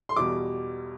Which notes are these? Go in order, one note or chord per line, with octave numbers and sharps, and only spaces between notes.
C6
E2 B2 G3 D6